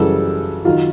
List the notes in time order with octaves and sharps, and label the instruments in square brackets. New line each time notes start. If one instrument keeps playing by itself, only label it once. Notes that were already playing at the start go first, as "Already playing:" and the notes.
Already playing: [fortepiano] F#2 C#3 E3 G3 A4
D#3 F#3 F4